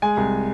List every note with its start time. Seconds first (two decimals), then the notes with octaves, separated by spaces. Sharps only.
0.02 G#3 G#5
0.17 C2